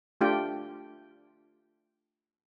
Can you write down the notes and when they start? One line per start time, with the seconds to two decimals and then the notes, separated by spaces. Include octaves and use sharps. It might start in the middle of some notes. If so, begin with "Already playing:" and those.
0.21 A3 D4 F4 G4 G5